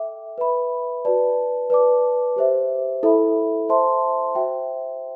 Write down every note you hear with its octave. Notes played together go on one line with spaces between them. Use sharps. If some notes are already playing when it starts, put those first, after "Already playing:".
Already playing: A4 E5 G5 D6
B4 E5 B5
F#4 B4 D5 A5
B4 D5 A5 D6
G4 C5 E5
E4 A4 E5 B5
C5 E5 A5 C6
F#4 C5 E5 G5